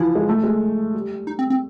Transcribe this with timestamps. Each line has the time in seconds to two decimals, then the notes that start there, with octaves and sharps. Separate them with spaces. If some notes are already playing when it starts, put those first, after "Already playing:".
Already playing: E3 F3 E4
0.15 G#3
0.29 A3
0.43 G#3
0.94 G3
1.27 D#4
1.39 C4
1.50 C4